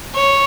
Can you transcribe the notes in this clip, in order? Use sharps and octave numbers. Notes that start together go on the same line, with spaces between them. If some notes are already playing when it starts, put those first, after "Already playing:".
C#5